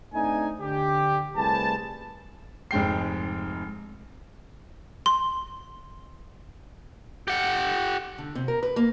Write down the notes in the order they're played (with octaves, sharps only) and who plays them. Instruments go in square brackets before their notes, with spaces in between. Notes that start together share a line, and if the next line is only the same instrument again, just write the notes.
[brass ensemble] A3 C4 D4 D#4 G#5
D3 G4
C2 A3 G#4 B4 C5 A5
[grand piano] F1 G#2 G#3 G5 C7
[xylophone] C6
[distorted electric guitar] G4 F#5
[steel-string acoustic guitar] D3
C3
A#4
B4
A#3